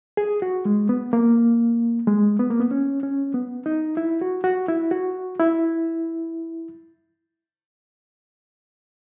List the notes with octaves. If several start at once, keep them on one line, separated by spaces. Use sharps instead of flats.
G#4
F#4
G#3
B3
A#3
G#3
B3
A#3
B3
C#4
C#4
B3
D#4
E4
F#4
F#4
E4
F#4
E4